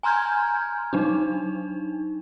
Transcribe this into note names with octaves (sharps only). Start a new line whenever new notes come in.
G#5 A#5 C6 F6 G6 G#6
F#3 D4 D#4